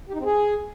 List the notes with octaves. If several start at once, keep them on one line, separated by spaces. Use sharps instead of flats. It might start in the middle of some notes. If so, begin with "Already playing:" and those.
G4
D#4
C4
G#4